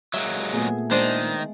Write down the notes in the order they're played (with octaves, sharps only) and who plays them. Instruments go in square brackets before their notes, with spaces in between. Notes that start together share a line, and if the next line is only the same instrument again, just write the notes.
[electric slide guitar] F#3 G#3 A#3 [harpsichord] E5
[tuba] A#2 [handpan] A3 B3 G#4
[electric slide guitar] D#3 [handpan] G#3 [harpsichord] D4 C5